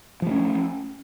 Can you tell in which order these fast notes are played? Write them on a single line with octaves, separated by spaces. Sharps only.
F3 A3 C#4